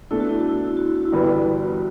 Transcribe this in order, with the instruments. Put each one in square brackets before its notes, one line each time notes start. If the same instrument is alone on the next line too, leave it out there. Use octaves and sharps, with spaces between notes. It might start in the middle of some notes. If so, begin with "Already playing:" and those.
[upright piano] B2 A3 D4 A4 [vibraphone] E4
[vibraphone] F#4
E4
F#4
E4
F#4
E4
F#4
E4
F#4
E4
[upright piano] G1 G2 E3 G3 B3 [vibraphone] F#4
[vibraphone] E4
F#4